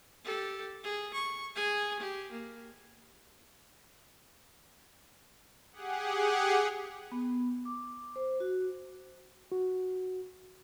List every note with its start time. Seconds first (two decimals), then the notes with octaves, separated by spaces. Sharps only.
0.25 G4 A4
0.84 G#4
1.14 C#6
1.56 G#4 G#5
1.99 G4
2.32 A#3
5.72 G4 G#4 F#5
7.12 B3
7.65 D6
8.16 C5
8.40 F#4
9.52 F#4